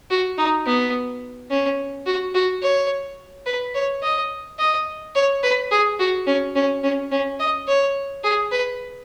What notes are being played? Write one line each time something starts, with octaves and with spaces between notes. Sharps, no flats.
F#4
D#4
B3
C#4
F#4
F#4
C#5
B4
C#5
D#5
D#5
C#5
B4
G#4
F#4
C#4
C#4
C#4
C#4
D#5
C#5
G#4
B4